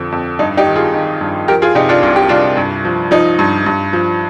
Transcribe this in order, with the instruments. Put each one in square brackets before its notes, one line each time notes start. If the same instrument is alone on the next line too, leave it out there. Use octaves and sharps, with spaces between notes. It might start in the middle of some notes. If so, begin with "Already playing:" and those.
Already playing: [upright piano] F2 D3 F3
F2
G2 D#4
D#4 G4
D#3
F4 G#4
D#3
G2
F3 G4 A#4
F4 G#4
C3 D#4 G4
D4 F4
C2 F4
G4
C2 D4 F4
G2
F3
F3 D#4
G2
G2
F3